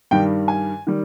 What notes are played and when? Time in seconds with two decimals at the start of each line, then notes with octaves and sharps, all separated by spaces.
0.11 G2 D#3 G3 G5
0.48 G#5
0.87 D#3 G3